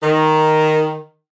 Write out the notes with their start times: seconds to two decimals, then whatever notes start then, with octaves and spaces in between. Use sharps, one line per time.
0.03 D#3